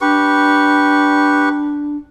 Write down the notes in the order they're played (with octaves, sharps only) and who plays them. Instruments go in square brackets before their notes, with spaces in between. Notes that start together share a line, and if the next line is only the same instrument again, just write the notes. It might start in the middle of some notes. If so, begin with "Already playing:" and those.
[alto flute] D4 [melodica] G4 B4 C#6